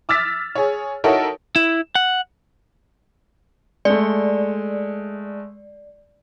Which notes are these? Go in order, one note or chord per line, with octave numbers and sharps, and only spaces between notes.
D6 E6 F6 A6 B6
G#4 C#5
D#4 E4 F#4 A4 A#4 C#5
E4
F#5
G#3 A3 D5